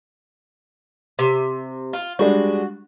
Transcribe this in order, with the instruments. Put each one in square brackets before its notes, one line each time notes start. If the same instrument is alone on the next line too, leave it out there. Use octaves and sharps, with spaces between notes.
[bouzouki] C3
F4
[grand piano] G3 G#3 D4 [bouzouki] F#4